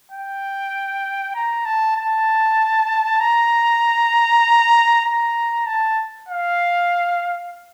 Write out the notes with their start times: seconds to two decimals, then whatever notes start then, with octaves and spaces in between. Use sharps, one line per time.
0.12 G5
1.35 A#5
1.65 A5
1.97 A5
3.20 A#5
5.05 A#5
5.67 A5
6.29 F5